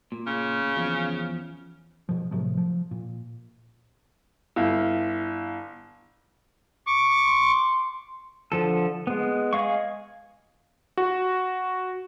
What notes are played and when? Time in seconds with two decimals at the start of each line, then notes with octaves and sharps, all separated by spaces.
0.12 A#2
0.27 C#3
0.76 E2 F3 C#4
2.09 B2 F3
2.31 A2 C3 F3 F#3
2.57 F3
2.91 A#2
4.56 G1 E4 F5
6.87 C#6 D6
7.26 C6
8.52 D3 F3 A4
9.07 G#3 B3
9.53 G#4 D#5 F5 C#6
10.97 F#4